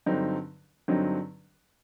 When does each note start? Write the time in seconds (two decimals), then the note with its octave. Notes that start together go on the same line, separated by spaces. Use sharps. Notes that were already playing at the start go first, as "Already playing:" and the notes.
0.06 G2 D3 F#3 C4 D#4
0.88 G2 D3 F#3 C4 D#4